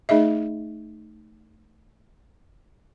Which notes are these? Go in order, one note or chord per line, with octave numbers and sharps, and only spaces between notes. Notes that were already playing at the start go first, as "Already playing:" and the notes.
A3 D#4 G#4 D#5 E5